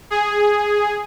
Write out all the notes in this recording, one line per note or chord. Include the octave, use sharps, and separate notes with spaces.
G#4